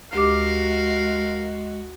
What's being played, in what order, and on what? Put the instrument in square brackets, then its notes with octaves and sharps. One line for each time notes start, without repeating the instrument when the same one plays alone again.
[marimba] D2 G4 D6 [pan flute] G#3 [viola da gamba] F#4 [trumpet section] A#4 F5